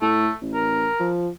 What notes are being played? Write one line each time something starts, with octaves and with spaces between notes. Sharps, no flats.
A2 A3
A1
A#4
F3